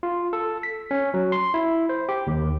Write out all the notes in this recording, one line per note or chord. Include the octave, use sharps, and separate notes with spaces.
F4
A4
B6
C#4
F#3
C6
E4
C5
G4
D#2